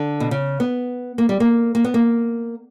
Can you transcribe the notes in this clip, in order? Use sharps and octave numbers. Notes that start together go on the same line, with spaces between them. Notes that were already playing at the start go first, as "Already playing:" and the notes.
Already playing: D3
B2
C#3
B3
A#3
G3
A#3
A#3
B3
A#3